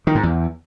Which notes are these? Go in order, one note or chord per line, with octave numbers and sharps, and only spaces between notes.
D#3
G#2
E2